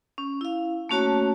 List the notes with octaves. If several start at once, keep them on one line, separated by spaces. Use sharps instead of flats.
C#4
E4 F5
A3 A#3 C#4 F#4 C#5 A5